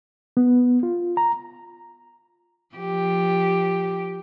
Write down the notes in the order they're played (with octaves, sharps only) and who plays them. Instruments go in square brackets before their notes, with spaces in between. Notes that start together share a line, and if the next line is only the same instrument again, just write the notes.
[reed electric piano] B3
F4
A#5
[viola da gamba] F3 G4